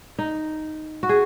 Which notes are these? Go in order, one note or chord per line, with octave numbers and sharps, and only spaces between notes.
D#4
F#4
G#4